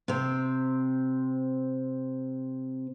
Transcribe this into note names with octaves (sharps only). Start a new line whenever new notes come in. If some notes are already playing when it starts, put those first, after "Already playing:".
C3 C4